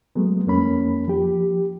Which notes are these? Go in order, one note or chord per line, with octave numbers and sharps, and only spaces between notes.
F#3 G#3 A3 B3
F2 A#3 C#4 B5
F3 G4